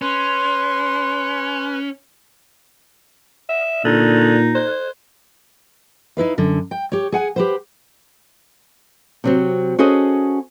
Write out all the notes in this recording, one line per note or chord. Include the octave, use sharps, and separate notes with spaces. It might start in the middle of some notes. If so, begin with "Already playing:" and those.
C#4 B4 C6
E5
A#2 D3 D#4
C5
D#4 E4 B4 F5
F#2 D3
G5
G4 C#5
G#4 F#5 G#5
G4 B4 C5
C3 F#3 C4
C#4 F#4 G#4 A4 C5 D#5